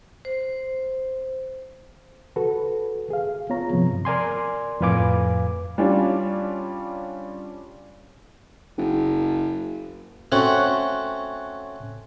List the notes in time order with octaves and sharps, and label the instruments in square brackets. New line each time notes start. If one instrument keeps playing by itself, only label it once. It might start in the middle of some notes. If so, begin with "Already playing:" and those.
[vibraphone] C5
[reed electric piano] F#4 A4 B4
G#4 F5
B3 F4 C#5 A#5
G2 C3 F3
A#4 D5 G#5 C6
F2 A2 B4 F5 G#5 D6
[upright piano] G3 C#4 D4 F4
[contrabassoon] F#1
[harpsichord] A3 C4 C#4 F#4 F#5